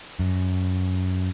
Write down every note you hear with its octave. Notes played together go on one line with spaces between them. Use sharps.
F#2